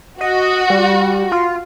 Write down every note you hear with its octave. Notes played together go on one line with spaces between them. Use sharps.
F#4 D#5
G3
F4